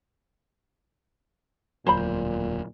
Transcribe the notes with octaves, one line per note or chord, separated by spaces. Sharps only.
E1 D2 A#2 F#3 C5 A#5 B5